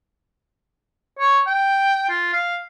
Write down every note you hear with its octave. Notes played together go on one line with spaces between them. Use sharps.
C#5
G5
F4
F5